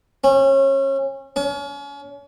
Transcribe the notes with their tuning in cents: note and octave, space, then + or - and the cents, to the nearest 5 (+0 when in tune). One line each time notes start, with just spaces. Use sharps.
C#4 -30
C#4 +35